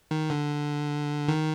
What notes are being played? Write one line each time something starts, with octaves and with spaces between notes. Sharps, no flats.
D#3
D3
D#3